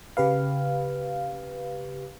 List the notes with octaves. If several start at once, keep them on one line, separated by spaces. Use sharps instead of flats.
C#3 G4 B4 F5